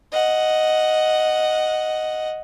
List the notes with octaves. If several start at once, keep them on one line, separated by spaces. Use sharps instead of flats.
D#5 F#5